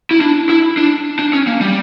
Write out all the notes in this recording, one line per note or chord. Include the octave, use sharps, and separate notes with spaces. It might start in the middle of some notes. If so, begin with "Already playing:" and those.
E4
D4
E4
D4
D4
C#4
A#3
G3